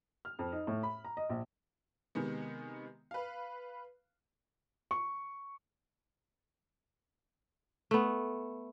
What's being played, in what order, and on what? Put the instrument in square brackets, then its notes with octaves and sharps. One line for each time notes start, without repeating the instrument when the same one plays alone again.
[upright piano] F6
F2
D#4
A2
B5
A#5
D#5
A#1
[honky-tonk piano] C3 D#3 G#3 B3
B4 F5
[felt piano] C#6
[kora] A3 B3